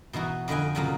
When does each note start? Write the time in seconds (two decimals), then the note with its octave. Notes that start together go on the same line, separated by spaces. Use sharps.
0.13 B2 E3 D#4 F#4
0.48 F2 D3 B4 D#5 G5 G#5
0.75 A#2 C#3 F3 F#3 A#3